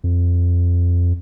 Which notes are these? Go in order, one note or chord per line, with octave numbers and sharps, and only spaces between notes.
F2